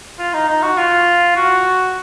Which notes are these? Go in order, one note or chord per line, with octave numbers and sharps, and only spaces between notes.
F4
D#4
D#4
F#4
F4
F#4